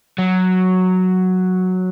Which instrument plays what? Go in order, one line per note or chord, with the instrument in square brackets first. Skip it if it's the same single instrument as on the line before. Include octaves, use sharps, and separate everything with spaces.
[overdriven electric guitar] F#3